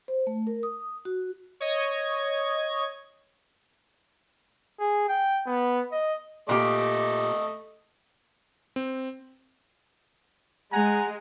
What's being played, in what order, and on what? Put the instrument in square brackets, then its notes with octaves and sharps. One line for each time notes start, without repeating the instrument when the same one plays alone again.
[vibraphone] C5
A3
A#4
D#6
F#4
[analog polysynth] C#5 D#5 G#6
[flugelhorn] G#4
G5
B3
D#5
[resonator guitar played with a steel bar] A#2 G4 [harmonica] A3 D#5
[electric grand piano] C4
[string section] G#3 [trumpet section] F#5 G#5 A#5